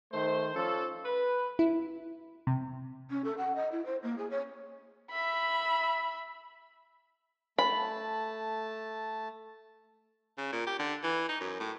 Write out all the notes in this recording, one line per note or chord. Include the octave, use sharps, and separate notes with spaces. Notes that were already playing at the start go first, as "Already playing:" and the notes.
D#3 A3 C5
F3 C#4 A4
B4
E4
C3
C#4
A4
F#5
D#5
E4
C5
A#3
G#4
C#5
E5 B5
A3 A5 B5
C#3
A#2
G4
D3
E3
D#4
F#2
A2